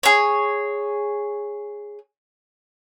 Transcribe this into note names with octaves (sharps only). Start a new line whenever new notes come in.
G#4 C#5